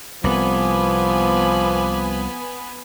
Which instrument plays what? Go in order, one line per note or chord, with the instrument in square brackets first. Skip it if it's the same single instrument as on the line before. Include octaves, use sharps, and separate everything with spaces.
[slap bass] C2 [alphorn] F3 [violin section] B3 G#5 [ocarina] D6